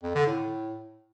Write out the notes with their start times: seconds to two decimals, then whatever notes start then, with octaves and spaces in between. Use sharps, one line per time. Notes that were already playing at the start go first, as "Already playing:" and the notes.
0.03 F2
0.15 D3
0.27 A2